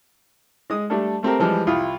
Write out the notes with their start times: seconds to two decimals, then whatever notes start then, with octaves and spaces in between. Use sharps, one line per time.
0.70 G#3 D#6
0.90 G3 A3 D4 A4
1.23 A3 C4 G4 A#4
1.39 E3 F3 G3 G#3 G4
1.67 C2 E4 F4 D#6